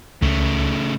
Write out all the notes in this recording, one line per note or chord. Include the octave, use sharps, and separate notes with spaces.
C#2 C#3 A3